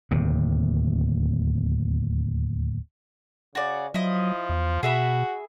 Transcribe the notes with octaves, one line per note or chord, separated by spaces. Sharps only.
D1 D#2 C3
C#3 F#4 D5
F3 F#3 E4 D#5
E2
B2 F#4 G#4 E5 B5